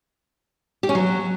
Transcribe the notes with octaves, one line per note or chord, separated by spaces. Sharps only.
G4
C#4
F#3